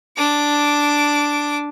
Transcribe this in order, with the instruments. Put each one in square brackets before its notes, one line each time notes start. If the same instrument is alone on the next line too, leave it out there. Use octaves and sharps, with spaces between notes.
[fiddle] D4 D6